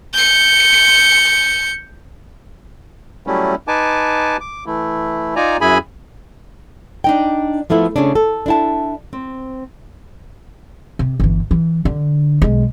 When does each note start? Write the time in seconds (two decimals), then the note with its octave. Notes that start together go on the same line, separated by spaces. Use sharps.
0.14 G6 C#7
3.27 F#3 G3 A3 C#4 E4
3.68 D#4 B4 G#5 A5 D6
4.40 D6
4.66 E3 A3 E4
5.36 D#4 F4 D5 G#5 A#5
5.61 F#2 E4 G#4 G#5 B5
7.04 D4 D#4 G5
7.70 F3 A3 B3 E4
7.96 C#3 A3 C#4 D4
8.15 A4
8.46 D4 E4 A5
9.13 C4
10.99 C3
11.20 G1 E3
11.51 E3
11.85 D3
12.42 B1 G#3